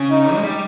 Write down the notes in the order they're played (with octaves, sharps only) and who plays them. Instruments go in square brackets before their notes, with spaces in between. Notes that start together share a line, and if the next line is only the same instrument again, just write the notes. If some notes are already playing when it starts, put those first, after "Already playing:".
Already playing: [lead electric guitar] C#3
[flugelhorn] D#4
[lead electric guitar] G#3
G3